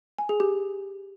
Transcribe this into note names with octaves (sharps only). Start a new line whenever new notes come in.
G#5
G#4
G4